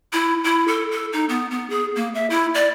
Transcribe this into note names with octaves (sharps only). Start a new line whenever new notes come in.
E4
E4
A4
A4
D#4
B3
B3
G#4
A#3
E5
E4
D5